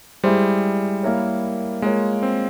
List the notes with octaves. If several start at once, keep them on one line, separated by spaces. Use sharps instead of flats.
G3 G#3 E4 G#4 C5
A#3 E4 A#4 C#5
G#3 A#3 F4 A#4 C#5
C4